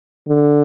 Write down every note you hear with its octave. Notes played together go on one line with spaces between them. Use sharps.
D3